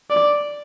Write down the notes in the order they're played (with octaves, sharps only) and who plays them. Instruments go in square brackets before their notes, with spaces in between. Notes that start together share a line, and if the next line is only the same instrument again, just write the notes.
[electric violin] D5